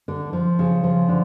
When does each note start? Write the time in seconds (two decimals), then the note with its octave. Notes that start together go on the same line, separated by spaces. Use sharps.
0.08 D3
0.33 F3
0.59 C#3
0.83 F3
1.09 D3